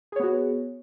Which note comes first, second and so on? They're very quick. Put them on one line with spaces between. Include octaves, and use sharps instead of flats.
G#4 C#5 B3 F#4 B4